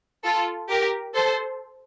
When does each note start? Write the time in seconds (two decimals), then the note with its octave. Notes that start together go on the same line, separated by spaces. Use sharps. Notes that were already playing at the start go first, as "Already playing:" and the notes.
0.25 F4 A4
0.70 G4 A#4
1.15 A4 C5